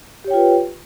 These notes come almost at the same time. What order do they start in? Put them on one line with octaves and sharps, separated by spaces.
G4 C#5 G5 F4 B4